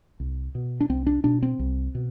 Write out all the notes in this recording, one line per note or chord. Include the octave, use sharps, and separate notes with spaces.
C2
B2
D4
C2 C4
D4
B2 D4
C4
C2
B2